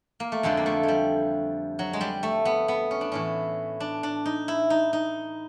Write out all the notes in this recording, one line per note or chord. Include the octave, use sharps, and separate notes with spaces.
A#3
A3
F2 D3 F3 G#3
A#3
A3
G#3
G3
F#3
G#3
G3
A3
B3
B3
C#4
D4
A2 E3 C#4
D4
D4
D#4
E4
D#4
D#4